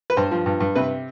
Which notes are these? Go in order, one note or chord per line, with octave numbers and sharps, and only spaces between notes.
B4
G2 C5
F3
G2
G2
C3 B4